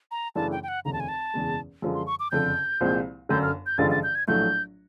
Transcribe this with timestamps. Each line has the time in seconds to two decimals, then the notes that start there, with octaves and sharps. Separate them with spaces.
0.11 A#5
0.36 F#2 C#3 E3 A3 D4 A5
0.52 G5
0.63 G5
0.68 F#5
0.85 F1 D#2 C#3 A#5
0.93 A5
1.00 G#5
1.08 A5
1.34 F#1 E2 B2 G#3
1.82 F#2 D3 F3 G#3
1.94 C6
2.07 C#6
2.20 D6
2.31 F#1 F2 D3 G6
2.81 C2 A#2 F3 G#3 C4
3.29 G1 F#2 D3 G6
3.42 F6
3.66 G6
3.78 A1 G2 D3 F3 G#3 A6
3.91 A6
4.03 G6
4.15 G#6
4.27 A#1 A2 F#3 A3 G6